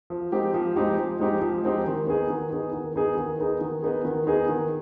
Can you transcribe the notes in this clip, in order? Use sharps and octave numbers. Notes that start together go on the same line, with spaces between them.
F3
G#3 C4 D#4 G4
F3
G#3 C4 D#4 G4
F3
G#3 C4 D#4 G4
F3
G#3 C4 D#4 G4
D#3
B3 D#4 G#4
D#3
B3 D#4 G#4
D#3
B3 D#4 G#4
D#3
B3 D#4 G#4
D#3
B3 D#4 G#4
D#3
B3 D#4 G#4
D#3